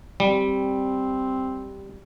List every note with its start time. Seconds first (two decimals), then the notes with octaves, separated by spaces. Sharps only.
0.20 G3 C4